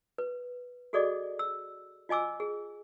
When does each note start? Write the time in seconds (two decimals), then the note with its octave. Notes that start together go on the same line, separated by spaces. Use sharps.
0.18 B4
0.93 F#4 G#4 A4 D5 D#5 D6
1.39 E6
2.09 F4 D#5 G#5 D6 E6
2.40 G#4